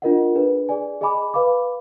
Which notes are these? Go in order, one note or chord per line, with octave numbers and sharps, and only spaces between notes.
D4 F4 A#4 D#5 F#5
D4 G#4 B4
G#4 D5 G#5
G#4 D#5 G#5 B5 D6
B4 F5 B5 D6